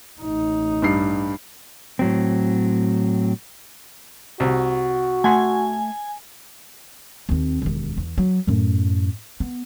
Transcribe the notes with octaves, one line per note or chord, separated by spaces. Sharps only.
A1 D#4
G2 G3 C7
A2 F#3 C4
C2 F#4
A3 F#5 G#5 C6
D#2 C4
E1 D#2
E2
F#3
F#2 A2
B3